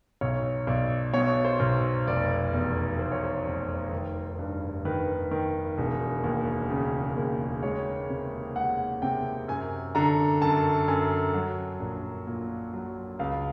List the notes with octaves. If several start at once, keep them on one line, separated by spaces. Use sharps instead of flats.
B1 C#5
B1 D5
B2 C#5
C5
B1
F1 D5
E2
F1 C5
C#5
C5
F1
D#3
G2
D#3 B4
D#3
E1
D#2
C#3
D#2
G#3 C#5
C3
G#3 F#5
C3 G5
F#2 G#5
D3 A#5
F#2 A5
F#2 G#5
F#3
A#1
A#2
F#3
C#2 F5